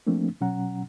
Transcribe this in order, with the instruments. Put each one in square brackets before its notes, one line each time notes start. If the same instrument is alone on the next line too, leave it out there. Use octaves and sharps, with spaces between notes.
[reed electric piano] F3 A3 A#3 C4 D4
B2 F#3 C#4 F#5 A#5